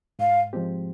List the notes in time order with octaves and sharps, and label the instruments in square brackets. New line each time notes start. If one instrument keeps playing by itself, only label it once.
[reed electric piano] G#2 [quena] F5
[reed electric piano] F3 G#3 C4 G4